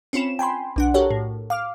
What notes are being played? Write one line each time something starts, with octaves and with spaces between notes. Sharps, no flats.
C4 C#4 F4 B5 E7
G5 G#5 B5 C6
B1 D4 F#5
F#4 G4 A4 A#4 C#5
A2
F5 D6 F6